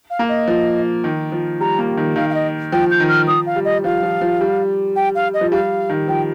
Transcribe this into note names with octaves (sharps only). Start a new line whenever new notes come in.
F5
A#3
D#5
F3
D#3
F3
G3 A#5
A#3
D#3
D#3 F5
F5
D#5
F3 G5
G6
D#3
F6
F3 D#6
F5
G3
D#5
F3 F5
F3
F3
G3
G5
F5
D#5
F3
G3 F5
D#3
F3 G5